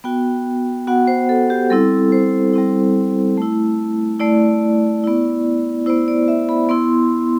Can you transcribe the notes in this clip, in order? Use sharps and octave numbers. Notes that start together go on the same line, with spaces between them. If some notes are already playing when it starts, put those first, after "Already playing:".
B3 F#4 G5
B3 F#4 F#5
C5
A4
G4
G3 C4 E4 A4
C5
G3 C4 E4
A3 E4
A3 E4 D5
B3 E4
B3 E4 C5
D5
E5
B5
B3 E4 C6